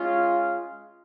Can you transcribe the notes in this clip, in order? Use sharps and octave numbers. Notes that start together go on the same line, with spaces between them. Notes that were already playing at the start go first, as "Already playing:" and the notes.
Already playing: G#3 C#4 F4